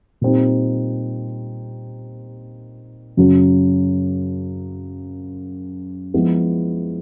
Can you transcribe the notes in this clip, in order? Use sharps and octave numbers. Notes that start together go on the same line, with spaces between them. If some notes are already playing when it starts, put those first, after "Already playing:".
A#2 G3 C4 D#4
F#2 C#3 F#3
F3 G#3 B3 E4